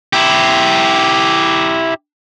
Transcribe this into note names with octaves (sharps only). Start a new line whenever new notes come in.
E4 G4